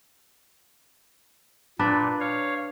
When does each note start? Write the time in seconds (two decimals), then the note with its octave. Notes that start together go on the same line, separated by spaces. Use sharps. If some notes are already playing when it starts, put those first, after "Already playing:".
1.79 A#2 D4 B4 D5
2.20 C#5 F5